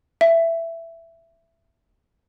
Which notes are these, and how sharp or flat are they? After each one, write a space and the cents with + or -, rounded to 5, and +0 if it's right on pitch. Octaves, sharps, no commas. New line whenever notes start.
E5 +10